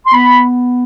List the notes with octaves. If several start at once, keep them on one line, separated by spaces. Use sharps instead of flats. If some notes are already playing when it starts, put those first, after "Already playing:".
C6
B3 B5